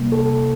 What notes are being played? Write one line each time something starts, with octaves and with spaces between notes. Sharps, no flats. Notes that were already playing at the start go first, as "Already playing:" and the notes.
Already playing: C3 G3 A#3
A4